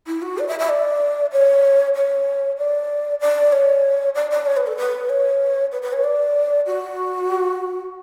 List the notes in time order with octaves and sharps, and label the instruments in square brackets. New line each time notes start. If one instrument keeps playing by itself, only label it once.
[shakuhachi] E4
F#4
D5
E5
E5
D5
C#5
C#5
D5
D5
C#5
D5
D5
C#5
B4
A4
B4
C#5
B4
B4
C#5
D5
F#4